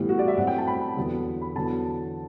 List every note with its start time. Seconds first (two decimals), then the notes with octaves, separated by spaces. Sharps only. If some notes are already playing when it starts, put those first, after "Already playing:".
Already playing: A2 E3 G3 B3
0.09 F#4
0.19 D5
0.28 E5
0.37 A2 F#3 C4 F#5
0.47 G5
0.58 A5
0.67 B5
0.97 E2 D3 F#3 B3
1.41 B5
1.55 E2 D3 F#3 B3 A5